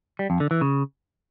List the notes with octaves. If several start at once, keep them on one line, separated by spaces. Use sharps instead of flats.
G3
F2
D3
E3
C#3